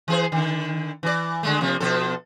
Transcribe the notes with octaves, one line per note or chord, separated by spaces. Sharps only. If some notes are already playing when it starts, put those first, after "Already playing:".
E3 G#4 C5
D3 D#3
E3 D5
D3 G#3 A3
C3 F3 A#3
B2 F3 A4